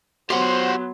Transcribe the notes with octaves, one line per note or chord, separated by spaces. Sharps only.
F#3 B3 G4 C5 F#5 C6